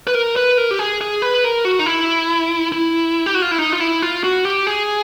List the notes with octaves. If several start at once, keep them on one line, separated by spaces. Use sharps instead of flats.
B4
A#4
B4
A#4
G4
G#4
G#4
B4
A#4
F#4
D#4
E4
E4
G4
F#4
F4
E4
D#4
F4
E4
F4
F#4
G4
G#4